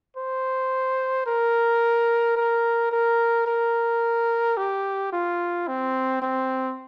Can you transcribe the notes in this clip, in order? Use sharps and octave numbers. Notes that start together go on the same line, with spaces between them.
C5
A#4
A#4
A#4
A#4
G4
F4
C4
C4